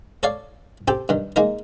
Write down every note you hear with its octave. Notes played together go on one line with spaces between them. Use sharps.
A4 C#5 D5 F5
C4 G4 A4 G5
G2 D#3
G#3 A#3 D#4 A#4